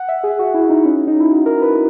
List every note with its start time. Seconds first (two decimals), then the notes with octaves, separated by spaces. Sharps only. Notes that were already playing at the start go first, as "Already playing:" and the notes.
Already playing: F#5
0.08 E5
0.23 G#4
0.39 F#4
0.54 E4
0.70 D#4
0.85 C#4
1.07 D#4
1.20 E4
1.31 F#4
1.46 A#4
1.62 B4